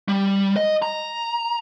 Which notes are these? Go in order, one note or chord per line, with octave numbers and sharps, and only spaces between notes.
G3
D#5
A#5